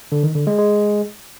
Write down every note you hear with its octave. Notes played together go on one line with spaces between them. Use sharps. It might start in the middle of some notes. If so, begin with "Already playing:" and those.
D3
D#3
D3
G#3
G#3